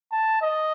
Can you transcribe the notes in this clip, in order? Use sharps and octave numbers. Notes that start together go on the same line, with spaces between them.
A5
D#5